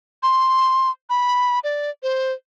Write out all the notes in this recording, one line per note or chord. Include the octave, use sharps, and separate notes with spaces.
C6
B5
D5
C5